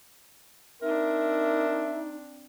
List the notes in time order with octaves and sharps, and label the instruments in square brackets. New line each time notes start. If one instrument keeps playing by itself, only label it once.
[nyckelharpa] C4 D4 [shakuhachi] D#4 [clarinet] A#4 [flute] E5